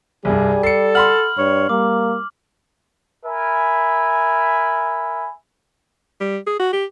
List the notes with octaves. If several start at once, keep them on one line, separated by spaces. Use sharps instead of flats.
C2 G2 G3 G#4
A4 C7 C#7
F#5 B5 C6 F6 F#7
G2 C#5
G3 A#3 D6
A#4 E5 G#5 B5
G3
G#4
F#4
G4